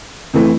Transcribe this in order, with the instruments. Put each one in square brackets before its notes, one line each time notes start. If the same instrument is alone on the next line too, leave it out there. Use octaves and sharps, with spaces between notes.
[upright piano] F2 E3 A3 E4